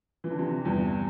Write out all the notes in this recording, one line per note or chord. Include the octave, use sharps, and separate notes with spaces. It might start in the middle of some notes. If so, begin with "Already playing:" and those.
E3
D3
C3 E3
E2 G2